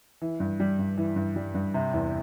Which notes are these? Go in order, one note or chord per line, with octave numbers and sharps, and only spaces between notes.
E3
G2
G3
G2
E3
G2
G3
G2
C3
E2